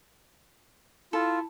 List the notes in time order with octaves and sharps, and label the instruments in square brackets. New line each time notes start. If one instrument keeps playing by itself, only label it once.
[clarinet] E4 [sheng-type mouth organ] F4 [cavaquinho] A4